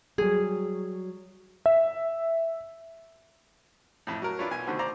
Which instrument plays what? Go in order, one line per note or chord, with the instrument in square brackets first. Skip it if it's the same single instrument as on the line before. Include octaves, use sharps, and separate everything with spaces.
[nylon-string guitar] F#3 G3 [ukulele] G#4
[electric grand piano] E5
[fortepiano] F2 A2
F#3 A#4
D4 E4 F4 B4 C#5
B1 G#5
B2 D3 D#3 A3 C4
C5 D5 A#5